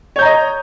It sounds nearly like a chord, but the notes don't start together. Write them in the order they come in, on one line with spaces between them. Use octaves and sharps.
C#5 G6 A#5 D#5